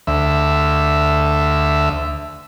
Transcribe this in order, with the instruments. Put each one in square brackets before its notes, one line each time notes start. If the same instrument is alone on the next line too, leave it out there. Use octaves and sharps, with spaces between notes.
[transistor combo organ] D2 E5